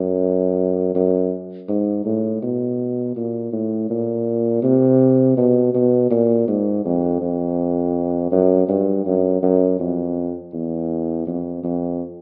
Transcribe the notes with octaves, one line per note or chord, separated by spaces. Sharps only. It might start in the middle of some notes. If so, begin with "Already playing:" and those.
Already playing: F#2
F#2
G#2
A2
B2
A#2
A2
A#2
C3
B2
B2
A#2
G#2
F2
F2
F#2
G2
F#2
F#2
F2
E2
F2
F2